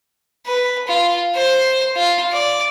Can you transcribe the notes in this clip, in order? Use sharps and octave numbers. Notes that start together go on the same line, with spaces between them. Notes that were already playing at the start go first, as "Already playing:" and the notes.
B4
F4
C5
F4
D5